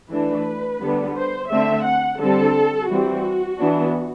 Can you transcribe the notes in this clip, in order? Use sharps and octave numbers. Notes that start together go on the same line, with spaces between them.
E3 A3 D4 B4
D3 G3 B3 D4
C5
D3 A3 C4 E5
F#5
D3 G3 C4 A4
E3 G3 C4 F#4
E3 B3 D4